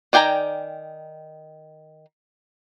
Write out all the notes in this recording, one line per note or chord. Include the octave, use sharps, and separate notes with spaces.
D#3 D5 G5 G#5 A#5